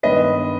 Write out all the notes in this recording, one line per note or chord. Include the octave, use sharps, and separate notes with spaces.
G2 D#3 G#3 B3 B4 D#5